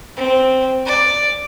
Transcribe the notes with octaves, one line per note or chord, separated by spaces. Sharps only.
C4
D5